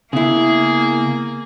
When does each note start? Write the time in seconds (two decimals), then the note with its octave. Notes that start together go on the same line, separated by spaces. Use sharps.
0.13 C#3 A#3 B3 E4 G#4